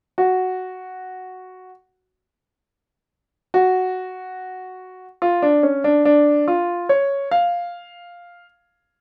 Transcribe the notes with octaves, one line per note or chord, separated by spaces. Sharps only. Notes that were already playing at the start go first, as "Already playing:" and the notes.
F#4
F#4
F4
D4
C#4
D4
D4
F4
C#5
F5